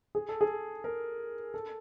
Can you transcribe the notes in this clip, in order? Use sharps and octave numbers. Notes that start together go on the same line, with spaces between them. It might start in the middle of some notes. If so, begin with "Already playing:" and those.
G#4
A4
G#4
A#4
A4